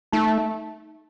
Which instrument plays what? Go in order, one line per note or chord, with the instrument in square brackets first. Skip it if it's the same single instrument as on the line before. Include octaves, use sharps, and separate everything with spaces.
[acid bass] A3 [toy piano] D#4